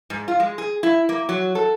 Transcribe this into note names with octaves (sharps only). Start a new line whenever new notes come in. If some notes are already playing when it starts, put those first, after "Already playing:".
G#2
F4
G#3
G#4
E4
A#3
F#3
A4